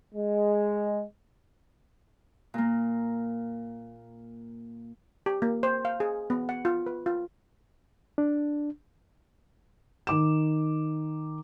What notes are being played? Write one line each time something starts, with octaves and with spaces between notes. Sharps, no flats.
G#3
A#2 A#3
G4
A#3
C5
F5
G#4
B3
F#5
F4
B4
F4
D4
D#3 D6 E7